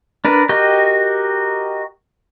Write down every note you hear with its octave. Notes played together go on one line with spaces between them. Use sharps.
D4 A#4 B4
F#4 G4 A#4 D#5 G5